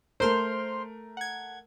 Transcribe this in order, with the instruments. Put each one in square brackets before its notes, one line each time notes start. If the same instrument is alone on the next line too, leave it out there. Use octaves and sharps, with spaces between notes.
[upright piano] A3 A#4 [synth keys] C5 C6 F6
[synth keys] F#5 G#6